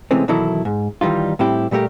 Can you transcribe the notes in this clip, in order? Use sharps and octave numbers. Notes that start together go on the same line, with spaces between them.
C3 E3 G#3 A3 C4 C#4
B2 D#3 E3 F#3 E4 A4
G#2
D#3 E3 G3 D#4 F4
A2 G3 C4 E4 G4
A#2 G3 A3 G4 A#4